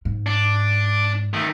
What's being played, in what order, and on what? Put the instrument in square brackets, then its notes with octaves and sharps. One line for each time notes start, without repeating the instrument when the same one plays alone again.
[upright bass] G#2
[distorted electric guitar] D4
D#3 A3